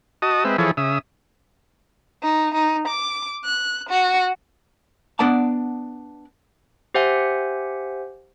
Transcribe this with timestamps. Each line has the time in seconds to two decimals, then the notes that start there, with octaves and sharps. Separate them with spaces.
0.22 F#4 D#5 A5 D#6
0.45 G#3 C4 B4 E5
0.58 E3 F3 E4 G#4 A4 C#5
0.77 C#3 E5 D#6
2.22 D#4
2.54 D#4
2.87 D6
3.44 F#6
3.89 F#4
5.19 B3 D4 D5 F#5 A5
6.94 G4 C5 E5 F#5 G#5